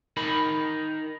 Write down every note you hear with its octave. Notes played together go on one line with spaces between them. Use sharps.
D#4 A#4 B5